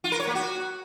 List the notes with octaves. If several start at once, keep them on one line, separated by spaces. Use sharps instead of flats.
F4
A#4
C#5
A#3
F#4